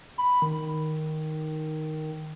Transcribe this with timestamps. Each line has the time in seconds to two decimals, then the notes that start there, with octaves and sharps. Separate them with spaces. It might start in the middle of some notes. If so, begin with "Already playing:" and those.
0.18 B5
0.42 D#3